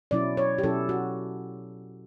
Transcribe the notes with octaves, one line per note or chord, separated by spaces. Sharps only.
B2 F#3 C#4 E4 D5
C#5
G4
B2 F#3 C#4 E4 A4
F#4